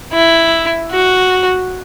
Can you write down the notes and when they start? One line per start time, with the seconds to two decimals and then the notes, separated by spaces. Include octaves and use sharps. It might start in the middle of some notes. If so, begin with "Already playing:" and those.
0.13 E4
0.91 F#4